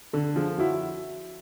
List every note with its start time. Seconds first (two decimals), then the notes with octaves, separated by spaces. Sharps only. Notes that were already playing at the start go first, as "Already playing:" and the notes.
0.14 D3 A4
0.36 F3 G#4
0.59 E4 F#4